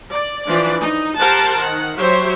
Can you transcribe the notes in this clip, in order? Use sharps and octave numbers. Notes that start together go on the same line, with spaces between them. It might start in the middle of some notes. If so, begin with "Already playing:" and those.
D5
E3 F3 D4 D5
D#4
G4 A#4 C5 F#5 A5
D#3 F#5
F#3 G4 C5 C#5 E5